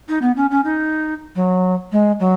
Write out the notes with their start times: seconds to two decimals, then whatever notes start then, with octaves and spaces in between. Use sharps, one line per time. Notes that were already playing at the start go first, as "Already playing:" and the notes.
0.09 D#4
0.22 B3
0.36 C#4
0.51 C#4
0.65 D#4
1.35 F#3
1.92 G#3
2.20 F#3